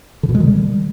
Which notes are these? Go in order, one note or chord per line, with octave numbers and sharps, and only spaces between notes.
D3
B2
G#3
D#3
G3